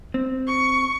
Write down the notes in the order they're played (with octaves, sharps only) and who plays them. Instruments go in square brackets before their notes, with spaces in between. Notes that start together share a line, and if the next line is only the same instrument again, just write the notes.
[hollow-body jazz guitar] C4
[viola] C#6